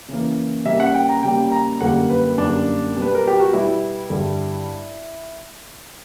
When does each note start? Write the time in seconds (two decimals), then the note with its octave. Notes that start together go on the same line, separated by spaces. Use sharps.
0.08 C#3 E3 A#3
0.65 C#3 G3 A#3 E5
0.80 F#5
0.94 G5
1.09 A#5
1.23 C#3 G3 A#3 G5
1.52 A#5
1.80 F#2 D3 G3 A#3 F#5
2.10 B4
2.38 F#2 D3 G3 A#3 D4
2.95 B2 G3 B3
3.02 B4
3.15 A#4
3.27 G4
3.40 F#4
3.53 B2 G3 B3 E4
4.10 G2 D3 G3